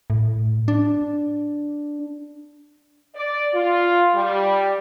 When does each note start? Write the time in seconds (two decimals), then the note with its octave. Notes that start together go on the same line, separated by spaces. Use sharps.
0.10 A2
0.68 D4
3.15 D5
3.54 F4
4.14 G3